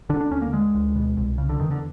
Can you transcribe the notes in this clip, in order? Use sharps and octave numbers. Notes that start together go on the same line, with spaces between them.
D3 D4
D4
D#2 C#4
A#3
D3 G#3
D2
B2
C2
C#3
D3
E2 D#3
D3